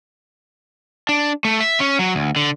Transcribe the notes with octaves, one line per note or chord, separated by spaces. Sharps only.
D4
A3
E5
C#4
F#3
D2
D3